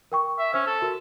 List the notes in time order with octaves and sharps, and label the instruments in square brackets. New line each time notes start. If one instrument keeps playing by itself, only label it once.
[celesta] A#4 G5 C#6
[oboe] E5
[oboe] C#4 [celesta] C5 E6
[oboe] A4
[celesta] F#4 A#4